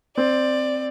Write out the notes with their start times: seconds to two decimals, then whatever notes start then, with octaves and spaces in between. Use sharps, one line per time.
0.17 C4 D5